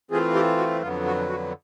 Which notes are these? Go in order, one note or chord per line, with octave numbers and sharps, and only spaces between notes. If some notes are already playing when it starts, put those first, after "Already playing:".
E3 A3 C4 F4 G#4
G4
F#4
F2 D3 F#3 B3 F4
F#4
F#4